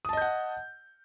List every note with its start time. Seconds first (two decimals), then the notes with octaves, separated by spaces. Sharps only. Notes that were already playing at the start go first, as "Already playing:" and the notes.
0.05 D#6
0.09 A5
0.13 D#5
0.17 G6
0.22 F#5